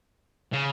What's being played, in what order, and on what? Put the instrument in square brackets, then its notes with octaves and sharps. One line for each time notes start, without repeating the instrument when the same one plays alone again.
[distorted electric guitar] C#3